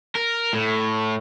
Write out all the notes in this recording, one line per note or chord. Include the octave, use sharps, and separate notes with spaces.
A#4
A2